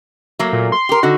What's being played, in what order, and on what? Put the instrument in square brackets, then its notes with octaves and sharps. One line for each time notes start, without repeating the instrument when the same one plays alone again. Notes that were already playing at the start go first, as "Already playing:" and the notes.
[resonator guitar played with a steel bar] F#3 A3 A#3
[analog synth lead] A#2
C6
[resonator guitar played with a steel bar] G4 A#4
[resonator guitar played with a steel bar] D3 D#4 [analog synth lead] F#4